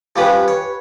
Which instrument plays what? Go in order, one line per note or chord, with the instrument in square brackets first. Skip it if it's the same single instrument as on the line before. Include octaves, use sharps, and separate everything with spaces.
[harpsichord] F3 G3 C#4 [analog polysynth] G4 B4
[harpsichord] C#5